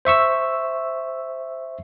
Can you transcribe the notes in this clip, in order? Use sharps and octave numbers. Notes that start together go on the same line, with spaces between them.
C5 E5 C#6 E6